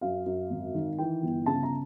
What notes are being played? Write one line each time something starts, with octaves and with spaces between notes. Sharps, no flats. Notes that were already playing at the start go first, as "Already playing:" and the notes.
F#2 F5
F#2
G#1
D#3
E3 G5
G1
C#3 A5
A#5